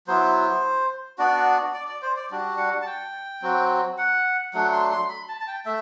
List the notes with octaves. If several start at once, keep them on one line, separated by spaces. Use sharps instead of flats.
F#3 B3 E4 C5
B3 D4 F#4 D5
D5
D5
C5
D5
G3 D4 F#4
F#5
A5
G5
F#3 C4 F#4
F#5
F#3 A3 D4 F#5
C6
C6
B5
A5
A5
G5
A3 E5